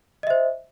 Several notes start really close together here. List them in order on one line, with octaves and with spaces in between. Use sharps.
D#5 E5 C5